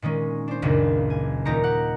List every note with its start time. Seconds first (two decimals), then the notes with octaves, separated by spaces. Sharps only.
0.02 A#2 D#3 G#3 C#4
0.48 D4 C5
0.62 F#1 C#2 A#2
1.10 G#5
1.45 D#1 A#2 D#4 G4 A#5 C#7
1.64 G4 F#5